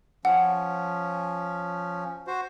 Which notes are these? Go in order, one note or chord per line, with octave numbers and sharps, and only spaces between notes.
F3 C#4 F#5
F#4 C5